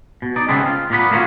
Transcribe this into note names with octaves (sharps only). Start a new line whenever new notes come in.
B2
D#4 D5
C#3 G#3 A3 B3 C4
F4
A#2 A#3 B3 B5
A3 A#3 C#4 F4 F#4